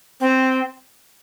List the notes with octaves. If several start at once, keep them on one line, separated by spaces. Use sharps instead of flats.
C4